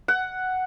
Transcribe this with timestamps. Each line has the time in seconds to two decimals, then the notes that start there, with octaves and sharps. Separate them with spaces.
0.08 F#5